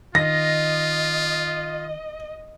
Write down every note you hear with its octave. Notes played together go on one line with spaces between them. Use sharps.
D#3 F4 D#5 A#6